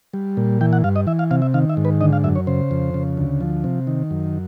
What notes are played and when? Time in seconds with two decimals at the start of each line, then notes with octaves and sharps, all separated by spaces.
0.14 G3
0.37 A#2
0.61 E3 G5
0.73 F#5
0.84 G2 F5
0.96 D#5
1.07 E3 E5
1.19 F5
1.31 C3 F5
1.42 E5
1.54 D#3 F5
1.70 E5
1.77 G#2
1.85 B4
2.01 D3 D#5
2.13 F5
2.24 F#2 E5
2.36 C#5
2.47 C#3 C5
2.71 F2
2.94 C#3
3.17 D2
3.41 F3
3.64 C3
3.87 D#3
4.11 F#2